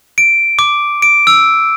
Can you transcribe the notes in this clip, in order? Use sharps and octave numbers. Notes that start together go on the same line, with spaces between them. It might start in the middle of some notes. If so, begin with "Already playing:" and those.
D7
D6
D7
E6